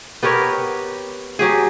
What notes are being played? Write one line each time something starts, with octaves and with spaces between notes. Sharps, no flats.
B3 G4 A#4 C#5
F#3 G4 G#4